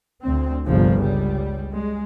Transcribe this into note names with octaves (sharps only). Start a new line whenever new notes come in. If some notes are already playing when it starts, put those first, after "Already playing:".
D2 C4
G1 C2 G2 C#3 F3
C#2 G3
G#3